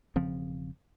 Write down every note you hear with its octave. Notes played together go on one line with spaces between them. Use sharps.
E1 C#3 F3 C4